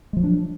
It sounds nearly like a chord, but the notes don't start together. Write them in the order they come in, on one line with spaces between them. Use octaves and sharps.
G#3 F3 F#3 D4